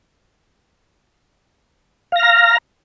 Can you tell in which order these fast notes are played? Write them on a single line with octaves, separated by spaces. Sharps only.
F5 A#6 F6 A#5